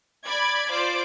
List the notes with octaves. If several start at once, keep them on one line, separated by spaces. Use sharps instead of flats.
D5 B5 D6 G#6
F4 C5 D5 D6